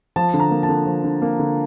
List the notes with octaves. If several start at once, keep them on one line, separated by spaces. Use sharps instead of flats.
F3 A5
D3
A#5
A#3
A5
D3
F3
D3
A#3
D3